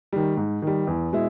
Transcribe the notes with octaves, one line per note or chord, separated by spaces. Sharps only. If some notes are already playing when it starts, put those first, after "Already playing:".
D#3 G3
G#2
D#3 G3
E2
B2 G#3 E4